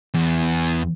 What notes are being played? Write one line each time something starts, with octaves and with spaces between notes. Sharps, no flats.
E2